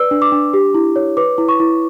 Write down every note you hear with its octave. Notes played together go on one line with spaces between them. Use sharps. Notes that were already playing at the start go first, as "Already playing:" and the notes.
Already playing: B4 D5 E6
D4
D6
D4
G4
E4
C#5
B4 D6
E4
C#6
E4